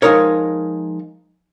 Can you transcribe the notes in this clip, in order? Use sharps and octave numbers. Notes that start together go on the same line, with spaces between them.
F3 F#3 G#3 D#4 A#4 C#5